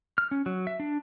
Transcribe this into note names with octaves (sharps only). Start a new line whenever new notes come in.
F6
C#4
F#3
E5
D4